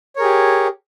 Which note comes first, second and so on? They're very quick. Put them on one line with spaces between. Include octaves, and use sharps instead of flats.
C#5 A#4 G#4 G4